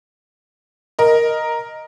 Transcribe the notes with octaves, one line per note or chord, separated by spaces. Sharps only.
A#4 D#5